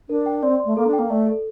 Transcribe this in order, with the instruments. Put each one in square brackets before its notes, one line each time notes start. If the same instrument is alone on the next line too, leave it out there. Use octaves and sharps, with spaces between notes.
[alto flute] D4 [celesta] A#4
[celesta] G5
[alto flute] C4 [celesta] D5
[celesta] C6
[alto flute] A3
[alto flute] A#3 [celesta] A4
[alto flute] D4
[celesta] G5
[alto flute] A#3
[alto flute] A3 [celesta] D5
[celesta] A4